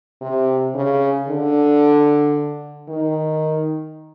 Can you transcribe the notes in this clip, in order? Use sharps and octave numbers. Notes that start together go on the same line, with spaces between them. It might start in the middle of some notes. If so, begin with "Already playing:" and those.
C3
C#3
D3
D#3